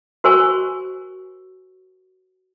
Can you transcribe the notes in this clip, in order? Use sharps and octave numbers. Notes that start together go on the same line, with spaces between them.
F#4 A#4 C5 G#5 C#6